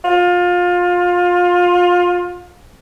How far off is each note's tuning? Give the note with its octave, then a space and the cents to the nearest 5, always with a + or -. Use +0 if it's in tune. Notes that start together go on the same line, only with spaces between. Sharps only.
F4 +25